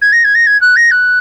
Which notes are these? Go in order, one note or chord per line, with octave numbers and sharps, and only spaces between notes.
G#6
A#6
G#6
A#6
G#6
F#6
A#6
F#6